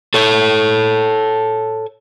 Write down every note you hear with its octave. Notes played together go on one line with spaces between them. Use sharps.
A4 C#5